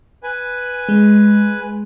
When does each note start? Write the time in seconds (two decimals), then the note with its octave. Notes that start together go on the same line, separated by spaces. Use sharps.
0.23 B4 G#5
0.89 G#3